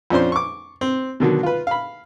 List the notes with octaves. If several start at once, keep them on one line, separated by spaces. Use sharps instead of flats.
F2 F3 C#4 D4 C5 C6
C#6 D6
C4
B2 D3 D#3 F#3
F4 B4
F5 B5